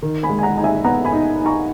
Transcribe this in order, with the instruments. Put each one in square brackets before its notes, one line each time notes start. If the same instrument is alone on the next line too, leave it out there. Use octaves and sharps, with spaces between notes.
[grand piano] D#3
[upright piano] G#5 B5
[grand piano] G#3
[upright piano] G#5
F#5 A#5
[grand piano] D#4 [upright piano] A#5
[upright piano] E5 G#5
G#5
[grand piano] B3 [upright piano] F#5 A#5
[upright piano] G#5 B5
[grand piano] D#4
D#4
[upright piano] A#5 C#6